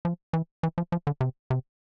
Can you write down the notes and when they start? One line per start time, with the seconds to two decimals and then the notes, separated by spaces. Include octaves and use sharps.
0.05 F3
0.33 E3
0.63 E3
0.78 F3
0.92 F3
1.07 D3
1.21 C3
1.50 C3